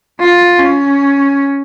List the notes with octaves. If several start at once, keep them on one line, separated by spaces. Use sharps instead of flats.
F4
C#4